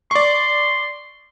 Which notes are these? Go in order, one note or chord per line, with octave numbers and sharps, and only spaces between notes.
D5 C6 C#6